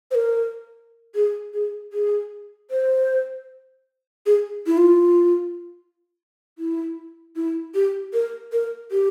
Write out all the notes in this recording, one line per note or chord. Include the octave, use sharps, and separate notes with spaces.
C5
A#4
G#4
G#4
G#4
C5
G#4
E4
F4
E4
E4
G4
A#4
A#4
G4